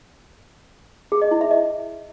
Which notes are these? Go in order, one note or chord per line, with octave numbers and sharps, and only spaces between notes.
G#4
D#5
E4
E5
D#5